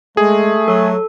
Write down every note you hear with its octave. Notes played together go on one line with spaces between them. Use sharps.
G#3 A3 G#4
F#3 A4